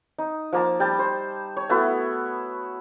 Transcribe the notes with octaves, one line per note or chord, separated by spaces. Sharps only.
D#4
F3 A#3 A5
G3 G5 A5
C5
C#5
A3 B3 E4 F#4